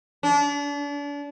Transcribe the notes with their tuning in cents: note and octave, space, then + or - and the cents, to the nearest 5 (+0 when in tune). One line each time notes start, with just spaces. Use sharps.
D4 -35